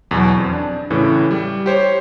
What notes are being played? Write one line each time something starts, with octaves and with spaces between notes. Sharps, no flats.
E2 B2 F#3
F2
D4
A2 C#3 E3
G3
G4 C5 C#5